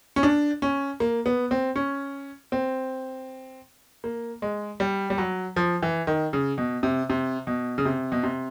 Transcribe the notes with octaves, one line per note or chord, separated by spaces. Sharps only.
C#4
D4
C#4
A#3
B3
C4
C#4
C4
A#3
G#3
G3
G3
F#3
F3
E3
D#3
C#3
B2
C3
C3
B2
C#3
C3
B2
C3